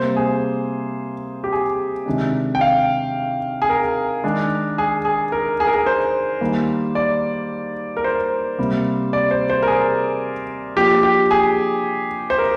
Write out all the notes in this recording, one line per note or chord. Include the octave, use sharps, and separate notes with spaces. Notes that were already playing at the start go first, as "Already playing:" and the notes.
Already playing: C3 G3 A#3 C5
G#4
G4
G#4
C3 D#3 G#3 D4
G5
F5
G#4
A#4
D#3 G#3 D4
G#4
G#4
A#4
G#4
A#4
G#4
C5
D#3 G3 A#3
D5
A#4
C5
C3 G3 A#3
D5
C5
C5
A#4
G#4
F3 A#3 D4 G4
G4
G#4
C5
A#4